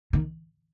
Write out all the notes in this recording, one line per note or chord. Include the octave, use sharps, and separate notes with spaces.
D#3